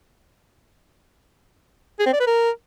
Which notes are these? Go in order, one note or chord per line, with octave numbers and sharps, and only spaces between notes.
G#4
C4
D5
B4
A#4